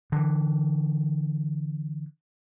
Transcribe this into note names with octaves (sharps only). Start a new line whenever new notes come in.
D3 E3